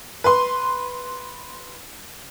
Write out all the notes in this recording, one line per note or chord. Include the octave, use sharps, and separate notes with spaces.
B4 C6